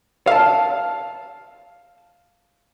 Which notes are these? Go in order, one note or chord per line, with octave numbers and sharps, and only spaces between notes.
F5 A5